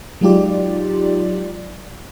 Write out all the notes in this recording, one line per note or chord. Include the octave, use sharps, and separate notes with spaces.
F#3 G#3 D#4 F4 G4 D5